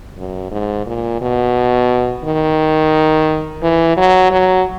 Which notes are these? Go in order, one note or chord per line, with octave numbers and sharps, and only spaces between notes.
F#2
G#2
A#2
B2
D#3
E3
F#3
F#3